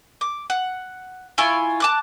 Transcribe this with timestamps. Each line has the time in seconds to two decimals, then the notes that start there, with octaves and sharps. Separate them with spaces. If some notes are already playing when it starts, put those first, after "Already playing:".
0.21 D6
0.50 F#5
1.38 E4 F4 G#5 C#6
1.80 A5 D6 F#6